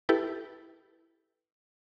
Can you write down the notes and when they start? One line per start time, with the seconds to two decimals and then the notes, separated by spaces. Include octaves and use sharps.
0.09 E4 G4 A4 B4